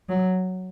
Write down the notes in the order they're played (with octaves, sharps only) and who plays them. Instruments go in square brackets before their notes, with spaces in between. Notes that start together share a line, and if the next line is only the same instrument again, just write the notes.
[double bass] F#3